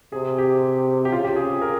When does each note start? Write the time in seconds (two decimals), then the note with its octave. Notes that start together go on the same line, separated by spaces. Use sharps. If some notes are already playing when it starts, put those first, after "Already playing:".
0.12 C3 G#4
0.38 G4
1.05 G4
1.11 C#3 F4
1.24 G4
1.36 G#4
1.62 A#4